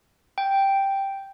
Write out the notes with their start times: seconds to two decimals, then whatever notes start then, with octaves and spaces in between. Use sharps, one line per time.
0.38 G5